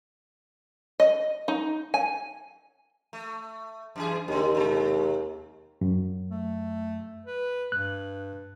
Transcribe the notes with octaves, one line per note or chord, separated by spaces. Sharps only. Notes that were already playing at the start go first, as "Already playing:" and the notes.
D#5
D#4
G#5
A3
F#2 E3 G#4
D#2 C#3 G3
B2 G#3
F#2
A3
B4
G2 F#6